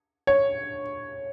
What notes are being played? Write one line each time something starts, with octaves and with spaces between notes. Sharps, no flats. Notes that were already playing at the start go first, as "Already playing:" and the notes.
C#5